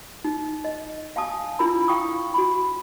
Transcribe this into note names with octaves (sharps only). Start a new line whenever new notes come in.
D#4
D#5
F5 G#5 A5 D#6
D4 E4 F4 A#4 A#5 B5
E4 F5 G5 C#6 D#6
F#4 B5